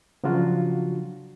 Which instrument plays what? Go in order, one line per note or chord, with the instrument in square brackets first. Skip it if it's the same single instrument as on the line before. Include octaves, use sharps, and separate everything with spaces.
[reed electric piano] C#3 F3 F#3 D4 F4 F#4